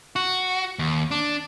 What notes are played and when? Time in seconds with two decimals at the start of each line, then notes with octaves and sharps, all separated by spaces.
0.16 F#4
0.79 D#2
1.11 D4